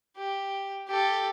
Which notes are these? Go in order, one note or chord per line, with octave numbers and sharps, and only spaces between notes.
G4
G4 A4